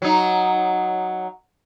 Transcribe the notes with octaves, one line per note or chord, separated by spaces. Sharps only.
F#3 D#4